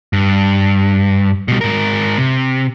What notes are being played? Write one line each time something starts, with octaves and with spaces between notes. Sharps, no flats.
G2
B2 G3
G#2 A#4
C3